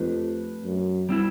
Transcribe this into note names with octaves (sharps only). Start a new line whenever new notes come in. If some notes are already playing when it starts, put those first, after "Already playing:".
Already playing: F2 A3 D4 G4 B4
F#2
G3 C4 E4